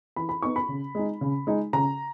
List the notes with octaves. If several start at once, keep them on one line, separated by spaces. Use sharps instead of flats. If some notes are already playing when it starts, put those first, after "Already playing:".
E3 B5
B5
B3 D#4 C#6
B5
C#3
G#3 D#4
C#3
G#3 D#4
C#3 A#5